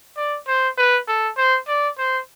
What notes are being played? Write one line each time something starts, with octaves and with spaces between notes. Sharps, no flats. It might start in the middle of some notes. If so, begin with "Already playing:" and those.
D5
C5
B4
A4
C5
D5
C5